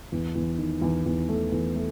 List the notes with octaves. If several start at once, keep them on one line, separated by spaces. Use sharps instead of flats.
E2
E2
D#3
E2
E2
A3
E2
A3